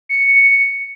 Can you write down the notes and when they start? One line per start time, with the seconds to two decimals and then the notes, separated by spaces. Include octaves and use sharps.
0.09 C#7